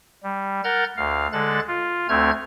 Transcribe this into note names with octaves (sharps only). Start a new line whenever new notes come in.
G3
A#4 F#5 F6 G6 A6
D2 F5
D3 G#3 A4 F#6 A6
F4
D2 A3 C4 F6 G#6